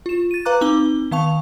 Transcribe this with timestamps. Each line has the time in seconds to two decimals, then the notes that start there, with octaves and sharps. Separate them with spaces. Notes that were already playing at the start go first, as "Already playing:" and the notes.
0.06 F4 E7
0.31 A6 D#7
0.45 B4 F5 A#5 D6 F#6
0.61 C4 D#4 D6 G7
1.11 D#3 B3 F5 A5 C#6 F7